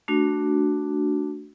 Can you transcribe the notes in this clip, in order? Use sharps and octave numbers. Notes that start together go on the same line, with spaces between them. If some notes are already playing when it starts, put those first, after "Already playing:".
A3 D4 F#4